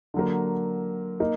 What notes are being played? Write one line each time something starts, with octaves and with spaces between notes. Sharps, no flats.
D3 F#3 A#3
A#3 D#4